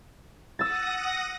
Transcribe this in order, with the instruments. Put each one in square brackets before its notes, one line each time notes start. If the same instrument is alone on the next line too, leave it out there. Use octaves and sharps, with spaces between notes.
[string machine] F#5 D#6 A#6 [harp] E6 A6